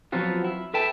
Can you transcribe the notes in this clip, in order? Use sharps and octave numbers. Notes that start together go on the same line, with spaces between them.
F3 F#3 B3 C4 F4 F#4
E4
A4 B4 E5 G5 A5